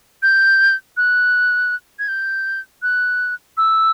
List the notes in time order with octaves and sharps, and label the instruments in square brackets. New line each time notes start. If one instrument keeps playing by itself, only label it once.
[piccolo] G6
F#6
G#6
G6
F#6
E6